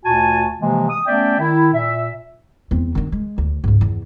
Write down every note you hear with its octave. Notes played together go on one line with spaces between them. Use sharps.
D2 A#2 F#4 G#5 A5
C3 E3 F3 G#3 A#3
D#6
A3 B3 C#4 D5 E5 G5
D#3 E4
A#2 E5
E2 C4
D#3 D4
G#3
D2
C#2 G#2
E2